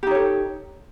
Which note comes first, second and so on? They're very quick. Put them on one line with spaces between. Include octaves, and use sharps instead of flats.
G4 D#4 C#5 A4